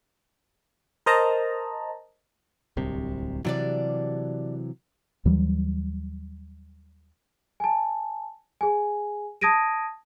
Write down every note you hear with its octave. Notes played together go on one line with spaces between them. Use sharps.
A#4 C5 D#5 A5 A#5
D1 C2 C3
C3 E3 F#3 G3 D4 D5
D#2 E3 F#3 G3
G#5 A5
G#4 G#5
A5 D#6 G#6 A#6 D7 D#7